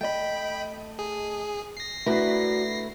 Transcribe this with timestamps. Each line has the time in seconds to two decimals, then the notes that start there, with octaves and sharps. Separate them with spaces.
0.01 A3 D#5 G5 B5
0.99 G#4
1.77 A#6 C7
2.06 A3 D4 E4 F#4 A#4 B4